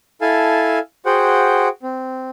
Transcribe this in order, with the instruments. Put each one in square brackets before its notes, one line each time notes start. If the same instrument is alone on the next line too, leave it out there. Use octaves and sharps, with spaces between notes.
[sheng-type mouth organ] E4 A4 F5 G#5 A5
F#4 G#4 C5 F#5 G5
C4